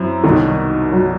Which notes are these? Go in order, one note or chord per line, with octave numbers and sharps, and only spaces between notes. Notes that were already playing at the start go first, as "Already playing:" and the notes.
Already playing: F#2 F#3 C4 E4
C2 B2 D#3 F#3
F#3